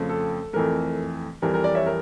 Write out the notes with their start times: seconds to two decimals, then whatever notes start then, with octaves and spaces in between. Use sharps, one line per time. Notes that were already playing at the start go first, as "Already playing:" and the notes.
Already playing: F2 C#3 F3 A3
0.09 A4
0.53 F2 E3 A3 A#4
1.42 F2 E3 G3 A#4
1.54 A#4
1.64 A#4 D5
1.75 C#5 E5
1.86 A#4